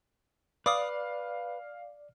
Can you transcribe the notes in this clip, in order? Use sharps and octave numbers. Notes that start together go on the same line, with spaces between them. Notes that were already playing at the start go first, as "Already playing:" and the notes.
B4 D5 F5 D6 D#6